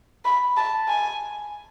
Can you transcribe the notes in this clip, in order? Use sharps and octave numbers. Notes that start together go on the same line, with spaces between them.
B5
A5
G#5